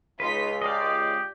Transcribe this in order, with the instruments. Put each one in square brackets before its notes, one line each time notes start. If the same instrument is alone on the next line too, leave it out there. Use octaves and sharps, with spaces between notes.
[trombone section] C#2 [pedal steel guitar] D#4 B4 [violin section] F4 B6
[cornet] G4 [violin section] D5 [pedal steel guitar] D#5 F5